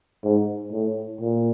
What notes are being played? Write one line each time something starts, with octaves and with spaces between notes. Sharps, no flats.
G#2
A2
A#2